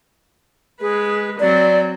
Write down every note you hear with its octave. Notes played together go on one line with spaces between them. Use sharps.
G#3 G#4 B4
F#3 C4 D5